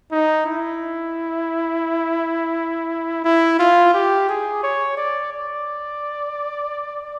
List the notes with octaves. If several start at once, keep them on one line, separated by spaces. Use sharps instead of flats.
D#4
E4
E4
F4
G4
G#4
C#5
D5
D5